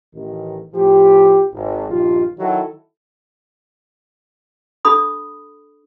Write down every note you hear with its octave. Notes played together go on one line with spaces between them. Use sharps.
A1 D#3
A2 F3 G4
G#1
A#1 G2 D#3 F4
D#3 F#3 E4 F#4 A4
D4 A4 B5 D#6